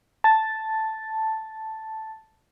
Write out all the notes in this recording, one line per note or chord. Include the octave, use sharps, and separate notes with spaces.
A5 A6